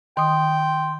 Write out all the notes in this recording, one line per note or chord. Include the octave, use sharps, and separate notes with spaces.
D#3 G5 C6 D#6